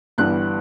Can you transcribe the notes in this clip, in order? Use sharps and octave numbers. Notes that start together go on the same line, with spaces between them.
G1 G2 E3 G3 B3 F#6